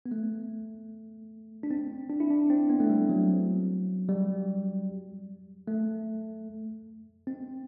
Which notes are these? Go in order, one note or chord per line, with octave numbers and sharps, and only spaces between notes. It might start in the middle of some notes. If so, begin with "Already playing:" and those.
B3
A3
D4
C4
D4
E4
D4
C4
B3
A3
G3
F#3
G3
A3
C4